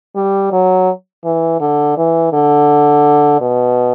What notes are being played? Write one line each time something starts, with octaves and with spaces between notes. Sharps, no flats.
G3
F#3
E3
D3
E3
D3
B2